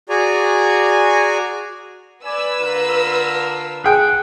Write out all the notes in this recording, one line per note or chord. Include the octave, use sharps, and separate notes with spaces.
F#4 G#4 D5 G#5 A#5
B4 D5 G#5 E6
D3 F4 A#4
G#4 F#5 G5